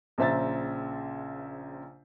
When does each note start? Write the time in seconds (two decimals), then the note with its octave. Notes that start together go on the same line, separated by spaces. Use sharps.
0.18 A#1 C#3 C5 E5 A#5 A6